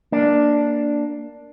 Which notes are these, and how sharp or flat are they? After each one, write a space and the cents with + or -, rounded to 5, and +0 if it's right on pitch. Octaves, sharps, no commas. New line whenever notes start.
A#3 +0 D4 +0